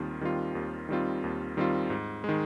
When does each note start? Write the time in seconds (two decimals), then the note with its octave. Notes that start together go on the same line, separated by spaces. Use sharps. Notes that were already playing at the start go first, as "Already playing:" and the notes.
Already playing: D#2 D#3 G3 C4 F4
0.21 D#3 G3 C4 F4
0.55 D#2
0.89 D#3 G3 C4 F4
1.24 D#2
1.57 D#3 G3 C4 F4
1.90 G#2
2.24 D#3 G#3